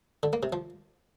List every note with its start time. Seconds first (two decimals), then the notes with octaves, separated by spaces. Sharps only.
0.23 D3
0.33 A#3
0.43 C3
0.53 F3